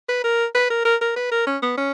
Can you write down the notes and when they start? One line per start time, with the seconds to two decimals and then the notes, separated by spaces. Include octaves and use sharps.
0.09 B4
0.24 A#4
0.55 B4
0.70 A#4
0.85 A#4
1.01 A#4
1.16 B4
1.32 A#4
1.47 C#4
1.62 B3
1.78 C#4